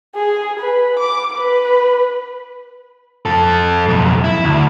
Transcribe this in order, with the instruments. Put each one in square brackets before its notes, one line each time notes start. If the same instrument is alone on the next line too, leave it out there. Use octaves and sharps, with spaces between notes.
[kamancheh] G#4
B4
D6
B4
[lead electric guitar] F2 A4
B1 F2
E4
D2